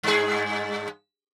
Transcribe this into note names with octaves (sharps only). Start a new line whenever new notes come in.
G2 G#4